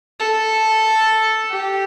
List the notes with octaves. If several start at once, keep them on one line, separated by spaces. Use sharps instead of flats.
A4
G4